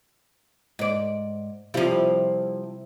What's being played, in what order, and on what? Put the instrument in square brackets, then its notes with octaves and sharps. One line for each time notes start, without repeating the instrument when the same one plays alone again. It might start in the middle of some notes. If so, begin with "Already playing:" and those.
[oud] G#2 D5
[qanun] C3 E4 F5 [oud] F3 G3